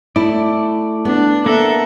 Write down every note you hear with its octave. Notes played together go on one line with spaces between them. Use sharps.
A3 E4 D5
B3 D4
A#3 A4 A#4 E5 F#5